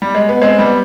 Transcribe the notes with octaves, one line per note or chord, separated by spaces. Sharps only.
G3
G#3
B3
G#3 C4
G3 B3